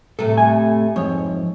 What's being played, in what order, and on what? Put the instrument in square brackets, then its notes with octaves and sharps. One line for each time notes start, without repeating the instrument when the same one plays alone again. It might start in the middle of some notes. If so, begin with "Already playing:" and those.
[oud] A2 C3 A3 [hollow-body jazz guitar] A4
[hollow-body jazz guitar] G#5
[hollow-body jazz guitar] F2 G#2 [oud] C#5